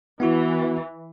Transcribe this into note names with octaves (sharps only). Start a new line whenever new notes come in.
E3 B3 E4 F#4